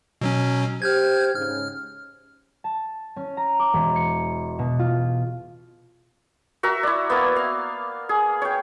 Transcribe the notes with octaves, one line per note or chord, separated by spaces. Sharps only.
B2 F#3 C#4
G4 C5 F6 G6 G#6
G#2 C#3 F6
A5
C#4
A#5
D6
E1
C#7
B2
F4
F#4 A#4 E5 A#5
E4 D5
A#3 B3
F5
G#4
C#5 G5